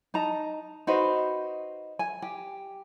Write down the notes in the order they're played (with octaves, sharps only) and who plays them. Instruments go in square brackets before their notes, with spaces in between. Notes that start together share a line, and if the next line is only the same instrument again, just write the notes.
[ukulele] D#4 A5 A#5
D#4 F#4 B4 C5
G#5
G4